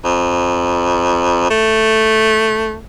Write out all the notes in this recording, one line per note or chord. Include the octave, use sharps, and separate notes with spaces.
F2
A3